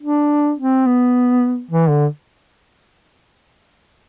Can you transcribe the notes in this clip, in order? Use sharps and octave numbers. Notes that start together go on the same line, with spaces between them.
D4
C4
B3
E3
D3